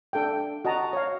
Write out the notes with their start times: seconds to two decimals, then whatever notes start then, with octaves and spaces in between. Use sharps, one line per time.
0.13 D4 A4 F5 G5
0.65 F#4 D#5 A5 A#5
0.93 C#5 F5